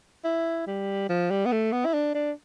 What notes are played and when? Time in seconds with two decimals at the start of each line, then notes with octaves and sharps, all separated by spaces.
0.25 E4
0.67 G3
1.09 F3
1.30 G3
1.46 B3
1.52 A3
1.72 B3
1.86 E4
1.93 D4
2.15 D4